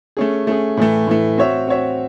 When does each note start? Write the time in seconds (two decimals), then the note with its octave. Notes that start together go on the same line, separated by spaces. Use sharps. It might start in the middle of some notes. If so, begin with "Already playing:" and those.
0.17 A3 C#4 G#4
0.47 A3 C#4 G#4
0.77 A2 E3 A3
1.07 A2 E3 A3
1.37 C4 F#4 C#5 E5
1.68 C4 F#4 C#5 E5